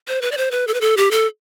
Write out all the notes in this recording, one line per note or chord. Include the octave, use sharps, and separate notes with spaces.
C5
B4
D5
C5
B4
A4
B4
A4
G4
A4